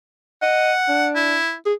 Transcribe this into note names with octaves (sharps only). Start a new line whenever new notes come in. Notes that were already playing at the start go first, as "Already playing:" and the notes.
D#5 F#5
D4
E4
G#4